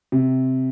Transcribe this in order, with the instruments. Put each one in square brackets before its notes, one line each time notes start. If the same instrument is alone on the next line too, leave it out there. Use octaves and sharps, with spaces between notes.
[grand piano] C3